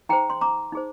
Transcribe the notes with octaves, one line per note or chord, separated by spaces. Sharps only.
D#4 G#4 C5 G5 A#5
C6
A#5 D6
D#4 G#4 C5